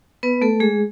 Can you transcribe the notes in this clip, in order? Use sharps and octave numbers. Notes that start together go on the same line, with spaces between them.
B3 B4
A3 A4
G#3 G#4